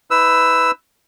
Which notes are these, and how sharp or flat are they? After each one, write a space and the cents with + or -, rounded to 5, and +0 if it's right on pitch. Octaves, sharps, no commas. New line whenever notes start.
D#4 +45 B4 +15 E6 +0